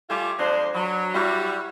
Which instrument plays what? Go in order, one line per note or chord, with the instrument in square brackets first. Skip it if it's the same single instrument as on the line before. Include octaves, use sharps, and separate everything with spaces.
[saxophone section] G3 A3 F4 [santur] G#5 C6 D6
[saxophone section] F2 G#3 C5 [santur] D4
[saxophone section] F#3 [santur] B5
[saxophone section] G3 F#4 [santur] E4 C#5